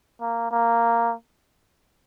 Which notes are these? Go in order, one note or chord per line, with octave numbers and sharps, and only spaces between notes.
A#3
A#3